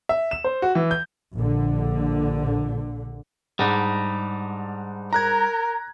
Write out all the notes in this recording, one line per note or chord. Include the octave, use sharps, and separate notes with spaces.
E5
E7
C5
F#4
E3
G6
A#1 D3
G#2 G3 D4 D#4 G#4 F#5
A#4 A#5 F#6 G#6